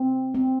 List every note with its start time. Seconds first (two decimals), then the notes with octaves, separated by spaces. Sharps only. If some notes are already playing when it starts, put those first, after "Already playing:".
Already playing: C4
0.34 C4